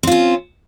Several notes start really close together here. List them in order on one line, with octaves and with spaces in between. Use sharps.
C4 F4 C#4